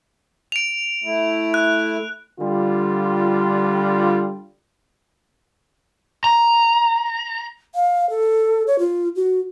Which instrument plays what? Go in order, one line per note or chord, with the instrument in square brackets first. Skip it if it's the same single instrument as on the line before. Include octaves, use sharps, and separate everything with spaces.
[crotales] D7 F7
[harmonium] A3 E4
[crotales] F#6
[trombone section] D3 G3 F4
[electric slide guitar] A#5
[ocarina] F5
A4
C#5
F4
F#4